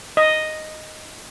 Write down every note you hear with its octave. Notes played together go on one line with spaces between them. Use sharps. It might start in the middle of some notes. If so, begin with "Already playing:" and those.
D#5